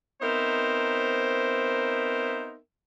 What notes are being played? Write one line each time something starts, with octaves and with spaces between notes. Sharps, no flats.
B3 C4 D#4 A#4 C5 E5